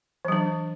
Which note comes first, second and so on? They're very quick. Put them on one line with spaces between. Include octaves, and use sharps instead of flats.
E3 F#3 D4